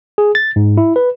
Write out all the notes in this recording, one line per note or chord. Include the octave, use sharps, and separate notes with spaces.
G#4
A6
G#2
E4
B4